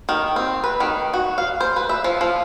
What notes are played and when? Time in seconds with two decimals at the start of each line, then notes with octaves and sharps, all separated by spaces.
0.09 D#3
0.36 C4
0.64 B4
0.80 D#3
1.14 F#4
1.38 F5
1.61 C5
1.76 B4
1.89 E5
2.04 F3
2.21 F3